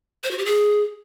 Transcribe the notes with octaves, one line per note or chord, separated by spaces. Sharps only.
C5
F#4
G4
G#4